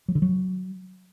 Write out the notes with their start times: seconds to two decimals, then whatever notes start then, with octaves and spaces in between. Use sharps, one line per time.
0.08 F#3
0.15 D3
0.22 F#3